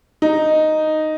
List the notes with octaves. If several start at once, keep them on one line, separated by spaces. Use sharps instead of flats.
D#4